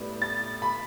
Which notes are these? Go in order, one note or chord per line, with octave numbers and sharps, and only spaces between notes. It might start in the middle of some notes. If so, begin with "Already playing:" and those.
Already playing: A2 G3 B3 E4
A6
B5